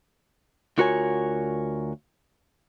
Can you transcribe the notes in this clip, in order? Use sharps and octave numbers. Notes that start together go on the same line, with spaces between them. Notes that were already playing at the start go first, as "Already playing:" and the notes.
D2 F4 F#4 A#4 C#5 G#5